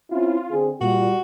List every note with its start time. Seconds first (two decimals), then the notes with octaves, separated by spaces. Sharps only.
0.11 C4 C#4 E4 F4
0.52 D3 C4 G#4
0.81 A#2 G3 F4 F#4